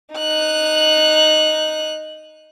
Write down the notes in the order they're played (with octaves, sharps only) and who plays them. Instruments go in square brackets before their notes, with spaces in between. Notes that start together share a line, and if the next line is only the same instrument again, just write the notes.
[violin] D#4 F#6